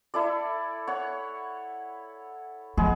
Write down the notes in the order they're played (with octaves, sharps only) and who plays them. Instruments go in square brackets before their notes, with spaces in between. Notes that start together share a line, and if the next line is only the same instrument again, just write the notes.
[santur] E4 A4 D5
C#5 F#5
[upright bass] F3 [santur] G#3 B3 G#4